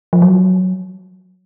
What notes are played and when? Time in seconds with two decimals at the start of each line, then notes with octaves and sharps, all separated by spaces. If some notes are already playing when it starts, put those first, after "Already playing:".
0.13 F3
0.22 F#3